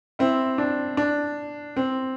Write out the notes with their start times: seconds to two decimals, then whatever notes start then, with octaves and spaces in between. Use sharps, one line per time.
0.19 C4 E4
0.58 D4
0.97 D4
1.76 C4